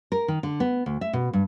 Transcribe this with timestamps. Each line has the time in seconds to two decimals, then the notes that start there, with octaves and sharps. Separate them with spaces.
0.12 A#4
0.28 D#3
0.43 D3
0.60 B3
0.86 D2
1.01 E5
1.13 B2
1.33 G2